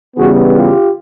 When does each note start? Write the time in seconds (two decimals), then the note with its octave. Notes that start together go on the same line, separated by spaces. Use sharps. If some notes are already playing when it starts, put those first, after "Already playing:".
0.17 C#3 E3 G3 B3 F#4 G#4
0.55 F4 G4